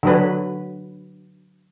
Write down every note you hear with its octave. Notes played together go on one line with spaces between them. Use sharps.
D3 F#3 B4